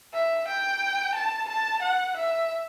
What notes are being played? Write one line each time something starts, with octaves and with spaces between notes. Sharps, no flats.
E5
G5
A5
A5
F#5
E5